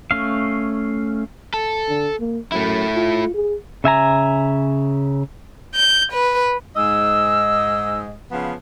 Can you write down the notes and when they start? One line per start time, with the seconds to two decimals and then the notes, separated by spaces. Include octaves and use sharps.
0.11 A3 C#4 F5
1.54 A4
1.88 D3
2.20 A#3
2.52 F#2 A3 E4
2.95 F4
3.34 G#4
3.84 C#3 E5 G#5 A#5
5.75 G6
6.13 B4
6.76 G#2 D#5 E6
8.32 C#3 F3 B3